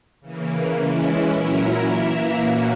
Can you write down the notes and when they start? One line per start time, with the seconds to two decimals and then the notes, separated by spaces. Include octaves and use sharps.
0.21 C#3 E3 A#3
0.74 E3 G#3 C#4 E4
1.28 A#2 F#3 C#4 E4 A#4
1.81 E3 A#3 E4 A#4 E5
2.35 A#2 A#3 C#4 F#4